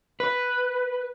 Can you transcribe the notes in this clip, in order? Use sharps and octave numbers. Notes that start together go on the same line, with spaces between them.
B4